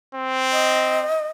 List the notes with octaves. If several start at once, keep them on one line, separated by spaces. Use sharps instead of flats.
C4
D#5